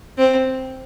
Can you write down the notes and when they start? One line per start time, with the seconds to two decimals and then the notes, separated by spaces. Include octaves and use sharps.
0.18 C4